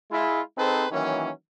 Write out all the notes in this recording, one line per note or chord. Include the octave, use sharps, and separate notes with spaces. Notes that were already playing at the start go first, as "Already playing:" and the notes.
G#3 E4 F4
C4 D#4 G#4 A4 B4 C5
D#3 E3 F#3 A#3 C#4